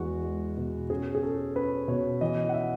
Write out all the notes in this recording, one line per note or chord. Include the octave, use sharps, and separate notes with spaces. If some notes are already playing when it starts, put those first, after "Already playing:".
Already playing: E2 G#3 F#4
G#3
B2
C#4 G#4
G#4
C#4 A4
C#4 B4
B2 C#5
E3 D#5
F#5
E5